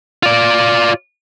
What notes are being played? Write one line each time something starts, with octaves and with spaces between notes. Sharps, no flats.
F4 D5